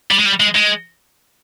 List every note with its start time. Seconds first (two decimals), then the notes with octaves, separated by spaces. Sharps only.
0.11 G3
0.18 G#3
0.26 G3
0.40 G#3
0.55 G#3